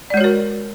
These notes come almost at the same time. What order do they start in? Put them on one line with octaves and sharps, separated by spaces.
D5 G#3 C#5 F#4 A#4